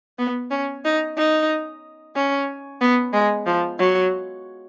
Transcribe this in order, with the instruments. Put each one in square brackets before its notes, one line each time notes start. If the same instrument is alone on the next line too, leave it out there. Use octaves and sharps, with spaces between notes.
[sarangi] B3
C#4
D#4
D#4
C#4
B3
G#3
F3
F#3